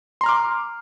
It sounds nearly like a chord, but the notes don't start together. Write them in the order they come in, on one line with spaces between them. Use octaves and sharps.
C6 A#5 F6 D6